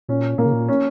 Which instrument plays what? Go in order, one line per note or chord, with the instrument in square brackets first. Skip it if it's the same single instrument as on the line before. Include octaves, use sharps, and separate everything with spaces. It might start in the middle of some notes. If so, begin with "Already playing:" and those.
[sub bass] A#2 [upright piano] C#4
[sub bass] A#2 [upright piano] A#3
[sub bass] C#3
A#2
[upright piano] C#4